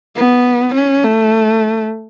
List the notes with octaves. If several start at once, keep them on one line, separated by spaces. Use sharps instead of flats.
B3
C#4
A3